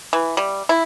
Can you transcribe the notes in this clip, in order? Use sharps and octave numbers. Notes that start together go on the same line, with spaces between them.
E3
G3
E4